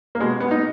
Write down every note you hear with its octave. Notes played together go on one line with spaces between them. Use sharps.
A#3
B2 G#3
B3
D#4